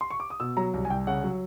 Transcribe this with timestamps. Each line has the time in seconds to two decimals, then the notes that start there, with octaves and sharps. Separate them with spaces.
0.01 C6
0.11 C#6
0.20 D6
0.30 D#6
0.40 B2 E6
0.57 F#3 A#5
0.74 C2
0.85 G#5
0.90 C2 G5
1.07 C#3 F#5
1.24 F#3